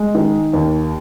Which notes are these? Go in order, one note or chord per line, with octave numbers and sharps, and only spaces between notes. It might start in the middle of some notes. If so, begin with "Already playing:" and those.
Already playing: G#3
D#3
D#2